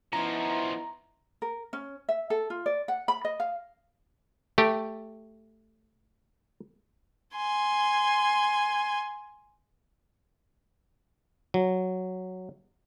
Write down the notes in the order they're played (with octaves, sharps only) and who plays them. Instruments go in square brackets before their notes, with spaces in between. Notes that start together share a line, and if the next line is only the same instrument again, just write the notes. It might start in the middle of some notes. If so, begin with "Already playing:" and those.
[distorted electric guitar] F3 C#4 [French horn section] B3 D#4 E4 [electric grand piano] A#5
[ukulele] A#4
C#4
E5
A4
F4
D5
F#5
B5
D#5
F5
[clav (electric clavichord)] A3 G4
[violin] G#5 C6
[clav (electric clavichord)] F#3